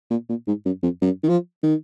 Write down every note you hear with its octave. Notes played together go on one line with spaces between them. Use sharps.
A#2
A#2
G#2
F#2
F2
F#2
D#3
F3
D#3